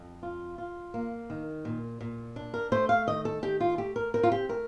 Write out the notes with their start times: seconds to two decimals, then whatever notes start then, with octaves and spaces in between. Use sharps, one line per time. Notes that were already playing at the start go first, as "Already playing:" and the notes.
Already playing: F2
0.23 F4
0.58 F4
0.94 A#3
1.30 D#3
1.65 A#2
2.01 A#2
2.36 D4
2.54 A#4
2.72 A3 C5
2.89 F5
3.07 D#3 D#5
3.25 A4
3.42 D#3 G4
3.60 F4
3.78 A3 G4
3.96 A#4
4.14 C4 A#4
4.23 F4
4.32 G4
4.49 A3 A#4